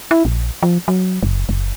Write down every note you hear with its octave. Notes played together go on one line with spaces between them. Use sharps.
E4
A#1
F3
F#3
F#1
F#1